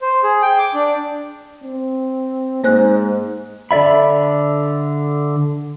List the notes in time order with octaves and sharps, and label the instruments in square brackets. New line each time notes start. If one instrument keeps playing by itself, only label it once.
[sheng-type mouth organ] C5
G#4
G5
D6
D4
[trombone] C4
[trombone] G#2 [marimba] A#3 C5 F#6
[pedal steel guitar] D3 A4 D5 E5 B5